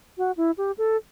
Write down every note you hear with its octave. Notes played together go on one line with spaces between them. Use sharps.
F#4
E4
G4
A4